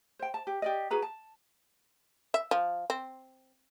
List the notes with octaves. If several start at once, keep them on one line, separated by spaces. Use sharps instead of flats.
C5 G5
A5
G4
G4 D5 D#5
F#4 G#4 B4 A#5
A5
E5
F3
C4